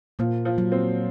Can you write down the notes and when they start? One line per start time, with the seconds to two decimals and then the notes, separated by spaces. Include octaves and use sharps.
0.19 A#2 F3 A#3
0.45 F3
0.58 F#3
0.72 C4